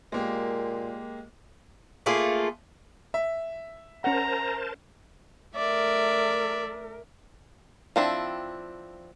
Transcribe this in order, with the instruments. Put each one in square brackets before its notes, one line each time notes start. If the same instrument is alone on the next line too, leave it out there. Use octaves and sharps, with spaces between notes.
[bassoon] A#2 [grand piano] G#3 A#3 G4
[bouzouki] A3 A#3 F4 G#4
[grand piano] E5
[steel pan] C#4 F#5 [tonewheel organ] A#4 C5 A5 [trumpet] A#5
[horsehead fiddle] A3 A#4 [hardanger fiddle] D5 E5
[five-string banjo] F3 C4 D4 E4